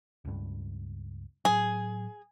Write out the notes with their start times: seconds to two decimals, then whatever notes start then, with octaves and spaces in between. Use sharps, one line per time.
0.25 C#2 G2
1.45 A2 F#3 G#4